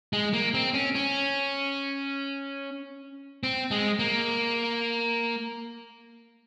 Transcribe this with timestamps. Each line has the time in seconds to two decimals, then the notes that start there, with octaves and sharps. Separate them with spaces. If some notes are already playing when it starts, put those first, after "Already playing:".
0.13 G#3
0.33 A#3
0.54 C4
0.74 C#4
0.95 C#4
3.43 C4
3.71 G#3
3.99 A#3